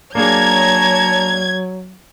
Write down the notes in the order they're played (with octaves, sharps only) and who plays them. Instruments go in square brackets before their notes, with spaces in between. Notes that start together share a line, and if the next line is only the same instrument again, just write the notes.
[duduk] F#3 [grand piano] A#3 D4 G#4 [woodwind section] C#5 A5 A#5 [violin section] G#6